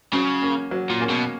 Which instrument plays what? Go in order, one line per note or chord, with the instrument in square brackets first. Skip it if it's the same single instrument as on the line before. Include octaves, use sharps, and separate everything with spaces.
[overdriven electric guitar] C#3 [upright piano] F#3
[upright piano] A#3 C#4
F#3
[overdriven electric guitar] A#2
[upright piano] A#3 C#4
[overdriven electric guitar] B2